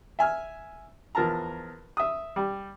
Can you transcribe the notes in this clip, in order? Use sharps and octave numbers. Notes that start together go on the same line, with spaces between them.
E5 G#5 F6
E2 F3 A#4 A5 A#5
E5 D#6
G3